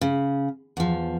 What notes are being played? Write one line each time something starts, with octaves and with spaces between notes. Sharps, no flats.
C#3
E2 F3